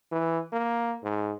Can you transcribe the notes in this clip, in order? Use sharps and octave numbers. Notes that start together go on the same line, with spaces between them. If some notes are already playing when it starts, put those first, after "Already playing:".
E3
A#3
G#2